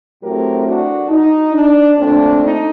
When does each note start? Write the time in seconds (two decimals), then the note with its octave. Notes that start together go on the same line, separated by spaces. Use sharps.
0.23 A2 F#3 A3 C4 G4 A#4
0.67 D4 F#4
1.10 D#4
1.54 D4
1.98 A#2 A3 C4 D4
2.42 D#4